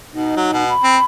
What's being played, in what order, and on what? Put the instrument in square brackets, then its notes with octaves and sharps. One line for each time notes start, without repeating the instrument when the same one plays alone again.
[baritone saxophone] B2 [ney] D#4
[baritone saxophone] F#3
B2
[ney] B5
[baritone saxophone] C4